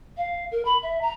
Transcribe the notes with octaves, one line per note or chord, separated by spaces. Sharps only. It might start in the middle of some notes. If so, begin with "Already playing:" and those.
F5
A#4
B5
E5
A#5